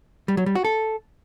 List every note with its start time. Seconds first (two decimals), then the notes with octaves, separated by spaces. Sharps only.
0.28 G3
0.37 F#3
0.46 G3
0.55 F#4
0.65 A4